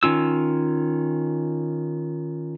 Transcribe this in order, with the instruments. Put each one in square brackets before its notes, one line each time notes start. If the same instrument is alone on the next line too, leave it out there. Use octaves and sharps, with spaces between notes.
[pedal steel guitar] D#3 C#4 F4 E6